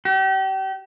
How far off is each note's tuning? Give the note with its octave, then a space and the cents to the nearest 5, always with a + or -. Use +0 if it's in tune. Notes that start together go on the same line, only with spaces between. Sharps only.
G4 -35